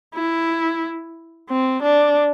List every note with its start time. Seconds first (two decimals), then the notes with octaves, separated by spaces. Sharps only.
0.15 E4
1.49 C4
1.83 D4